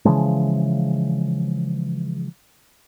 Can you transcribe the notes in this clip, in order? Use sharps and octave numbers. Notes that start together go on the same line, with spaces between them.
C#3 E3 F3 G#3